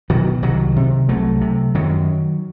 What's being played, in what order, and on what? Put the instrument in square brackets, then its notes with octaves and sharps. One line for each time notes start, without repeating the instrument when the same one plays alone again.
[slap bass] B2 D#3 F#3
C2 D#3 F#3
C3
C2 F#3 A3
C3
F#2 D#3 F#3